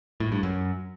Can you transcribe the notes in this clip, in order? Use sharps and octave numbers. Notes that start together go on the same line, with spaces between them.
A2
G2
F#2